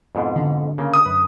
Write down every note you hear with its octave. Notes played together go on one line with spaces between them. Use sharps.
F2 G#2 B2
D3
C#3 A#3
D#6
F#2 B4